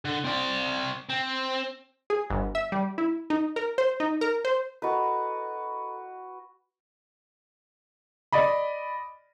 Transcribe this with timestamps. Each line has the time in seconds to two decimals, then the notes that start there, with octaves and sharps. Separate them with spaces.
0.05 D3
0.25 C4 D5
1.09 C4
2.10 G#4
2.30 G1
2.55 E5
2.72 G3
2.98 E4
3.30 D#4
3.56 A#4
3.78 C5
4.00 D#4
4.21 A#4
4.45 C5
4.82 F#4 A4 B4 D#5 A#5
8.32 D5 D#5 B5